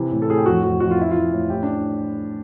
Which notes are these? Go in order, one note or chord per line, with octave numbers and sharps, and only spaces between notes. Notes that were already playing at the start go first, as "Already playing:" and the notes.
Already playing: C3 E3
A2
A4
A2 G#4
G4
F2 F#4
F2 F#4
F2 F#4
F4
E3 E4
E3 F4
A2
A2 G4
D4